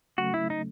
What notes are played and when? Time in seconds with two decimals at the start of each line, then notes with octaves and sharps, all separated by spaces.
0.18 C#3 F#3 A3 C#4 F#4
0.34 E4
0.50 D#4